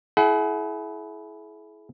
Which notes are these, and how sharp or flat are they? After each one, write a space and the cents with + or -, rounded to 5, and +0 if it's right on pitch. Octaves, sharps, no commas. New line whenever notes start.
E4 +0 G#4 +40 F#5 +30